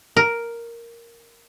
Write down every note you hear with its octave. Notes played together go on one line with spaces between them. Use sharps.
A#4